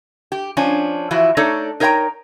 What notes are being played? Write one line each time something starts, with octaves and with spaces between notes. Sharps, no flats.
G4
F3 C#4 D4
E3 F3 E4 F#4
A3 D4 D#4 A4 C#5 D5
D#4 A#4 C#5 E5 G5 A#5